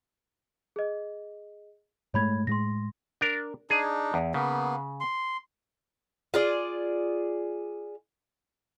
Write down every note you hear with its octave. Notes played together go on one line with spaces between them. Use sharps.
G#4 D#5
G#2 G#3 A3 C#5 B5 G#6
A2 G#3 C6 A#6
D4 A#4
D4 D#4 G#4
E2
C#3 A#3 B3
C6
F4 G#4 D5